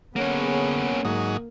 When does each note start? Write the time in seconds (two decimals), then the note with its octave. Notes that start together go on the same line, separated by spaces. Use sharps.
0.16 D3 A#3 B3 C#4 G#4 C#5 F#5
1.05 G#2 F#3 A#3 D#4